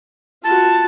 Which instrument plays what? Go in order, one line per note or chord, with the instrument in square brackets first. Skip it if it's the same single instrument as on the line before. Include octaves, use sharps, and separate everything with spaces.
[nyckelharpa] F4 F#4 [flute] A5